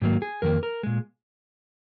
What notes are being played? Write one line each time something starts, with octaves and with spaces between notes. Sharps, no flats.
G#2 D#3 F#3 A#3
G#4
F2 D#3 A#3 A#4
A#4
A#2 G#3